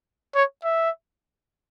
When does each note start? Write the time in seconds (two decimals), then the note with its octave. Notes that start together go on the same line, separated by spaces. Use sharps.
0.35 C#5
0.64 E5